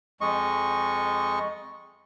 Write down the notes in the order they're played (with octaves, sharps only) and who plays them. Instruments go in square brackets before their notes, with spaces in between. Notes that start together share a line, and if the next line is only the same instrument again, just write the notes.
[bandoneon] F2 G#3 D#5 C#6